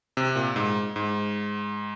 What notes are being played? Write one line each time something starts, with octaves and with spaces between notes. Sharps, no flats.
C3
A#2
G#2
G#2